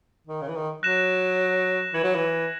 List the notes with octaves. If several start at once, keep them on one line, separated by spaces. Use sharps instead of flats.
D#3
C#3
E3
D#3
F#3 F#6 A#6 E7
E3 G#6 C#7 F#7
F#3
E3